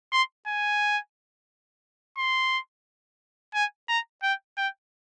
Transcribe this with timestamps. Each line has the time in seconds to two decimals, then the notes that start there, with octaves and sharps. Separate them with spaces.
0.12 C6
0.47 G#5
2.17 C6
3.54 G#5
3.89 A#5
4.23 G5
4.57 G5